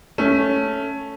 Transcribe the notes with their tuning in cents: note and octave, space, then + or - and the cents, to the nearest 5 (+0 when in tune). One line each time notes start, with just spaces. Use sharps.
A3 +0 C#4 +0 A4 +0